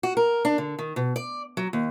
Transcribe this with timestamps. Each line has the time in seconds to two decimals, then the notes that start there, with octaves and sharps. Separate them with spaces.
0.03 F#4
0.17 A#4
0.45 D4
0.58 D3
0.79 D#3
0.96 B2
1.16 D5
1.57 F#3
1.73 D#2